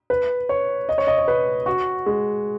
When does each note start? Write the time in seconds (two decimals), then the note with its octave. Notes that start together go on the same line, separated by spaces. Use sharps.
0.10 B4
0.49 C#5
0.89 D#5
0.98 C#5
1.07 D#5
1.18 C#5
1.28 B4
1.66 F#4
2.06 G#3